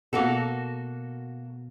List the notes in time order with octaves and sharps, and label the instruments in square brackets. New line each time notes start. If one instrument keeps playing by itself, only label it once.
[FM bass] B2 [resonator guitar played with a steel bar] A#3 F#4 A4